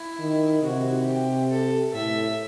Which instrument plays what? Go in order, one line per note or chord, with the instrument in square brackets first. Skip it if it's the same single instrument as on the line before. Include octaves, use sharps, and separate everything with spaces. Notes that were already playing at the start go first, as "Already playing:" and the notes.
Already playing: [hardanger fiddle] E4
[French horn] D#3
[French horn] C3 [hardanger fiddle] F#4
[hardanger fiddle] G4
A4
[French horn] A2 [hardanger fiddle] E5